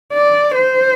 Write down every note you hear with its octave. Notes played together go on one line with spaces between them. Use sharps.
D5
C5